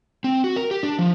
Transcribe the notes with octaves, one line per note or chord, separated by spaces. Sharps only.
C4
F#4
A#4
G4
D4
F3